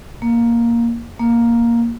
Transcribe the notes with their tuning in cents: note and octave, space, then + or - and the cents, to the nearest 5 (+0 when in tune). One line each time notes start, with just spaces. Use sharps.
A#3 +5
A#3 +5